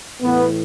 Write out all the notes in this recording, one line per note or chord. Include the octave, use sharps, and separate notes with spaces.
A2 E3 B3